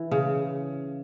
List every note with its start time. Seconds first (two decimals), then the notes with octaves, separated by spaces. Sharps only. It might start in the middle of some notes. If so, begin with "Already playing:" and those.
Already playing: E3
0.11 C#3